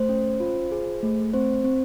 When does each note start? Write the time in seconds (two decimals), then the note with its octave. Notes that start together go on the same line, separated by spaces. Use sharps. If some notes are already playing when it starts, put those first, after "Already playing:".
Already playing: A3 C5
0.09 C#4
0.40 F4
0.72 G#4
1.02 A3
1.34 C4 C5
1.64 C4